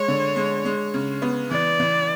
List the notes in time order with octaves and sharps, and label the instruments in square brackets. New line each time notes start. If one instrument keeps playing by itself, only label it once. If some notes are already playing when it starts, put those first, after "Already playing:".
Already playing: [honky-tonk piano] G#3 [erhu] C#5
[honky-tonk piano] D3
G#3
G#3
C#3
B3
[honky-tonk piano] E3 [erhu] D5
[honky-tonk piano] E3